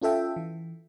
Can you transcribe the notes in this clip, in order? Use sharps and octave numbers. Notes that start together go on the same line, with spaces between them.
C#4 F4 A4 E5 G5
E3